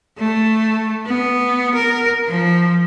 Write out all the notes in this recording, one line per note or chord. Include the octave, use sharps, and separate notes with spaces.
A3
B3
A#4
F3